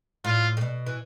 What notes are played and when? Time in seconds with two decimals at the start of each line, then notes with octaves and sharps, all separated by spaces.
0.24 A2 F4
0.57 A2
0.61 B2
0.86 E3